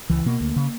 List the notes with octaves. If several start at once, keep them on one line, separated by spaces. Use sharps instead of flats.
C#2 E3
B2 A#3
D2
C#3